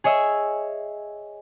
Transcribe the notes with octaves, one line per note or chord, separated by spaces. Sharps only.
G#4 C#5 D#5 E5